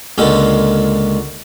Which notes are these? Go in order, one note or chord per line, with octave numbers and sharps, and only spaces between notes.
C#2 A#2 D3 G#3 A4